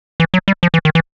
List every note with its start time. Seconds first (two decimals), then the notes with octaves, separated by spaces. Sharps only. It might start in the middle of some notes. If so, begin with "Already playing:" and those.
0.20 E3
0.34 F#3
0.48 G3
0.63 F3
0.74 E3
0.85 D#3
0.95 E3